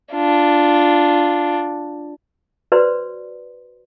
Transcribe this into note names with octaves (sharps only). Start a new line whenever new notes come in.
D4 F4
F#4 B4 C5 D5 C6